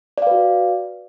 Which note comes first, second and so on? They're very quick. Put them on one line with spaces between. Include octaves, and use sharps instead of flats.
D5 F5 B4 F#4